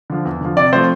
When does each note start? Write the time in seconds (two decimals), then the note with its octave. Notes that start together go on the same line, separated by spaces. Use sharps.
0.10 D3 F3
0.25 E2
0.41 D3 F3
0.56 C3 D5
0.72 F3 A3 C4 C5